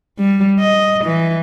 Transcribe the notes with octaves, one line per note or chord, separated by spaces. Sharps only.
G3
D#5
E3